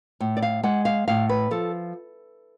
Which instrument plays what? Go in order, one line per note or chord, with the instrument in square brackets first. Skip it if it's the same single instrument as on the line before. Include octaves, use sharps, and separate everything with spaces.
[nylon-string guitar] A2
D5
F5
G#3 F#5
F5
A2 F5
B4
F3 A4